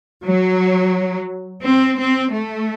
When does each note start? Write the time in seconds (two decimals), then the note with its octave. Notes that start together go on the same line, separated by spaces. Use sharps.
0.24 F#3
1.61 C4
1.96 C4
2.31 A3